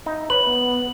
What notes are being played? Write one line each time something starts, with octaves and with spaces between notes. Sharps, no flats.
D#4 E5
B4 C#5 F#7
B3